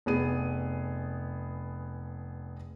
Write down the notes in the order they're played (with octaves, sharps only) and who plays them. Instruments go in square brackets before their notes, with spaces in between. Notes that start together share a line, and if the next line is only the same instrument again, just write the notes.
[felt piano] F1 B3 G#4 D#7